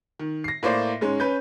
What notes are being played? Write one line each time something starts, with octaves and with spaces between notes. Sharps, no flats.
D#3
A#6 C7
A2 A#3 C5 D5
G#2 G#3 C#4
C#4 B4 G6